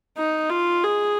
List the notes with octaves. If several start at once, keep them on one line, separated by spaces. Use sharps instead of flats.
D#4
F4
G#4